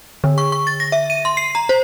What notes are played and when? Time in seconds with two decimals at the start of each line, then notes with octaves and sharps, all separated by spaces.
0.24 D3
0.38 C#6
0.52 C#6
0.67 A6
0.80 A#6
0.92 E5
1.10 D#7
1.25 C6
1.37 C7
1.55 A#5
1.69 C5